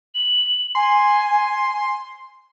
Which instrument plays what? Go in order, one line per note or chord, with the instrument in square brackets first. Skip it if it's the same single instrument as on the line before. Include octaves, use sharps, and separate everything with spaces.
[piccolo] F#7
[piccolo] G#5 [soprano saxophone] C6